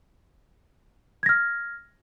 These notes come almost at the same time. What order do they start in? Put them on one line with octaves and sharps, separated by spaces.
G#6 A#6 F6